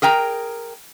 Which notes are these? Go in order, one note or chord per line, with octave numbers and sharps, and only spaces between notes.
G#4 A#4 G5 A#5